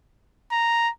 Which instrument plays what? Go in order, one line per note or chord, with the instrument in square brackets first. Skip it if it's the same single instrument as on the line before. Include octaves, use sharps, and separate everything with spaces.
[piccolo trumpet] A#5